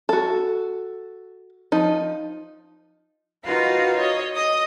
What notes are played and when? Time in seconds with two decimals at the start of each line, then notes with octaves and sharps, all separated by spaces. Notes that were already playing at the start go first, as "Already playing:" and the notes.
0.09 F#4 A4
1.72 F3 D#4
3.44 D#4 F4 F#4 A#4 B4 F5
3.97 C#5 D#5
4.34 D#5 D#6